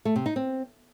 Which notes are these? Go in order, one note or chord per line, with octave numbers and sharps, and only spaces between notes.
A3
C3
D#4
C4